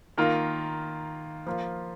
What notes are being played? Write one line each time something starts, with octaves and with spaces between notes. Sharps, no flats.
D#3 A#3 F4 A#4
F3 A#3 F4